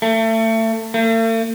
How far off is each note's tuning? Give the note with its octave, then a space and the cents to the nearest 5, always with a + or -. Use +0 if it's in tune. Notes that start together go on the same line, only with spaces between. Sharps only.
A3 +30
A3 +45